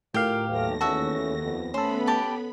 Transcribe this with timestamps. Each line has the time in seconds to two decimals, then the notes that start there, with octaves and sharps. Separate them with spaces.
0.14 D2 A2 F4 G4 A#4 F5 F6
0.48 D#2 F#3 A3 B3 A#6
0.81 E2 A3 C#4 F#4 A4 E5
1.41 F2 B3
1.74 A3 B3 C#4 A4 C5 B5
2.07 G4 A5 D6